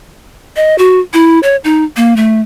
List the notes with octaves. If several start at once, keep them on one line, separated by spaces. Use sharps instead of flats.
D#5
F#4
E4
C#5
D#4
A#3
A3